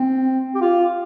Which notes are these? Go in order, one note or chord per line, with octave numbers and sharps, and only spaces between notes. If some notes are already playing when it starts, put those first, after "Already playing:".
Already playing: C4
G4
F4